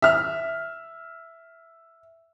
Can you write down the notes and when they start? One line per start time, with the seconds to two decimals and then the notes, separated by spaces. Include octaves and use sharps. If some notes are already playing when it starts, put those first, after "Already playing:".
0.02 E5 F6